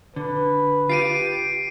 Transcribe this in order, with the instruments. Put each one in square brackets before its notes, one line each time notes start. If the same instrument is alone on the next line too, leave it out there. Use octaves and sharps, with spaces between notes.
[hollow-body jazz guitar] D3 [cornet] B4
[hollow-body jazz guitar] F4 G4 [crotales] C7 D7 D#7